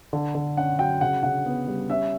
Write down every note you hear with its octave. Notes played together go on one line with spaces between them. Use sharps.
D3
D3
C#4 F#5
F#3 G5
C#3 F#5
C#3 F#5
B3
G3
C#4 E5